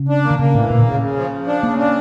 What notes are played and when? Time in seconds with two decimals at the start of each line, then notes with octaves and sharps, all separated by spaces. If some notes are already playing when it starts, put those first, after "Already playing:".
Already playing: C#3
0.08 D4
0.24 A#3
0.30 D3
0.39 C#3 A#3
0.55 A2 E3
0.70 A#2 A#3
0.80 D3
0.86 C#3 C#4
1.01 C#3
1.16 F3
1.32 F3
1.47 D4
1.63 C#3 A#3
1.78 D4